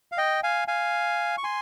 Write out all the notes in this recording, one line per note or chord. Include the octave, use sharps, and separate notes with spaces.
F5
D#5 G5
F5 G#5
F5 G#5
C#6
G#5 C6